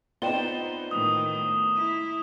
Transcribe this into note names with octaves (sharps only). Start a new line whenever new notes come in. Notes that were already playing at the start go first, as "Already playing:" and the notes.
B3 C4 D#4 F4 D5 G5 E7 G7
A2 D#3 D#6
E4